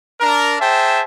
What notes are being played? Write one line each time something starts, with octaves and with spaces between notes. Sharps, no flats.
D4 A#4
G#4 C5 E5 G5 A5